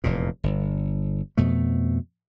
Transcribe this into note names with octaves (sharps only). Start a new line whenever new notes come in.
F1 E2 A#2
G1
F2 B2 A3